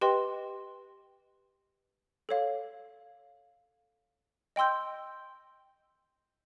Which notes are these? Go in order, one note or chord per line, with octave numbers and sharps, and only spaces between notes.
G4 B4 D#5 G5 C6
A4 C#5 F5
D#5 G5 C6 E6 G6